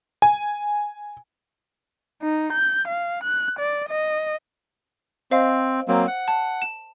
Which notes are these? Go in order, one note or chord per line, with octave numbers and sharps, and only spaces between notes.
G#5
D#4
G6
F5
F#6
D5
D#5
C4 C5 D#5 F5
F#3 A#3 C4
F#5
A5
E7